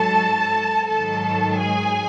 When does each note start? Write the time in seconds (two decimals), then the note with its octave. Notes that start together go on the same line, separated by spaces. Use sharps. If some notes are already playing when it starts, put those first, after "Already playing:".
Already playing: G#2 F#3 A4 A5
0.87 G#2 D#3 F#3 A4 A5
1.60 G#4 G#5